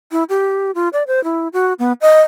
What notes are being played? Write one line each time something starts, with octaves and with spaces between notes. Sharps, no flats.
E4
G4
F4
D5
C5
E4
F#4
B3
D#5